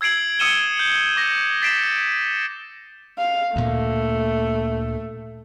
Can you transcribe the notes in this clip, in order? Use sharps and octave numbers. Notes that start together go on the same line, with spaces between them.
E6 G#6 C7 D7 F#7
D#6 E6 C#7 D#7 E7 G7
G6 F#7
D6 A#6
A6 B6 C7 D7 E7
F5
D2 A#2 A3 A#3